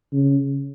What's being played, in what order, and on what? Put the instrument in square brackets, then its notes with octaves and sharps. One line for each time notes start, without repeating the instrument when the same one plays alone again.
[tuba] C#3